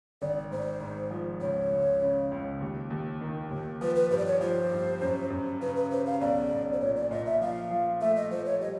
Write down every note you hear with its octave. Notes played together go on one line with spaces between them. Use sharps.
G#1 D5
G#2 C5
G#2
F3
C#2 C#5
C#2
C#3
C#2
D#2
D#2
D#3
D#2
F3 B4
B4
G2 C5
D5
C#5
F3 C5
G2
F#2
F#2
C#3 B4
B4
C#3 C5
F5
B1 D5
B1
C5
A#2 C#5
D5
A#2 D#5
E5
F3 F5
F3
A3 E5
D#5
F3 C5
C#5
G3 D#5